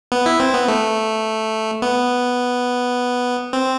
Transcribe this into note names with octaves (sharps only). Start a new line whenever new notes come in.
B3
E4
C4
B3
A3
B3
C4